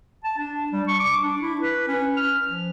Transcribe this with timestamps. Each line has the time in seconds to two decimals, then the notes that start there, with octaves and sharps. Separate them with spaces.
0.24 A5
0.38 D4
0.72 G3
0.88 C#6
0.99 D6
1.22 D4
1.42 E4
1.61 B4
1.88 C#4
2.17 F6
2.48 F3